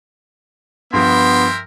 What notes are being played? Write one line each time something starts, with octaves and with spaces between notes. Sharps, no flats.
G2 F3 B3 A#4 E5 G5 C6